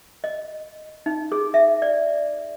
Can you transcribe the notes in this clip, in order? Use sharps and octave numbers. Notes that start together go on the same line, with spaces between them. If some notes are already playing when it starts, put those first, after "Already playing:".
D#5
D#4
G#4
E5
D5